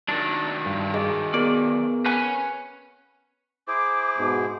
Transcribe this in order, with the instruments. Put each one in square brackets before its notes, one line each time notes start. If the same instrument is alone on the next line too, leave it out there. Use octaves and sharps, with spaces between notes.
[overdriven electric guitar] D#3 F#3 [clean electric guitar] D4
[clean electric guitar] G2
[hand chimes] G#4 D#5
[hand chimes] B3 G#4 A#4 [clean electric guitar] D5
[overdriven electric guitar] C#4 [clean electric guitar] B4 F#5 G#5
[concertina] E4 G#4 C5 [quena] D6
[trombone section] G#2 B2